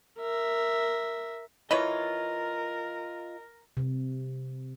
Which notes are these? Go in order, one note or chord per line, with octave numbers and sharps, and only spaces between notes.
A#4 E5
E3 F4 A#4 B4 C#5 D#5
C3